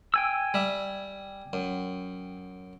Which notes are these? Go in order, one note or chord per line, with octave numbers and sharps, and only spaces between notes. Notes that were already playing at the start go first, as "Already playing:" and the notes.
G5 G#5 E6
G3 E5
F#2